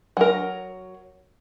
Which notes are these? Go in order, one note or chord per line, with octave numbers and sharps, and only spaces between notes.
F#3 A#4